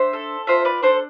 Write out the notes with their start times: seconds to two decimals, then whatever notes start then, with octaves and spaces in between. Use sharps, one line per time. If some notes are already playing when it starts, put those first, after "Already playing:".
Already playing: D4 C5 E5
0.13 A4
0.47 F4 C5 E5
0.65 B4 D5
0.82 D4 A4 C5